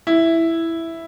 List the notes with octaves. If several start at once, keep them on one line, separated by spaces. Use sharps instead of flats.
E4